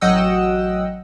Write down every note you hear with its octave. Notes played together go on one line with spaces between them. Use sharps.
A1 F#3 D#5 F#5 G5 E6